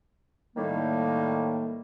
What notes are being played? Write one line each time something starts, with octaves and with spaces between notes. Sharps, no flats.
A2 D#3 G3 A#3